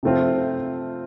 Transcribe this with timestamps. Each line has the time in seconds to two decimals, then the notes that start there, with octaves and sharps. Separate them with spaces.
0.03 C3 F3 A3 C4 F4